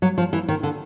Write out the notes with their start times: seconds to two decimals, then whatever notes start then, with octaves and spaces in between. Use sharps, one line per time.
0.02 F#3
0.18 F3
0.33 E3
0.48 D#3
0.63 D3